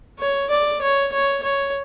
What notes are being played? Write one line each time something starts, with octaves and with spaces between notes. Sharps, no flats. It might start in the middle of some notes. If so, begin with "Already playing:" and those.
C#5
D5
C#5
C#5
C#5